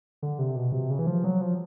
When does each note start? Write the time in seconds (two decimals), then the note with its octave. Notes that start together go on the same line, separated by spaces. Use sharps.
0.23 D3
0.39 C3
0.56 B2
0.72 C3
0.90 C#3
0.99 E3
1.07 F3
1.24 F#3
1.41 F3